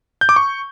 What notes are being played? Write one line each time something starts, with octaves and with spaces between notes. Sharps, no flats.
G6
D6
C#6